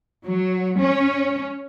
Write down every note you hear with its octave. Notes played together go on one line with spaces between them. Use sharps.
F#3
C#4